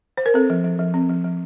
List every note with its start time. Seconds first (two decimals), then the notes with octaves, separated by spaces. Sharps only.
0.17 C5
0.26 A#4
0.34 C4 A4
0.50 F3
0.64 F3
0.79 F3
0.94 C4
1.09 F3
1.24 F3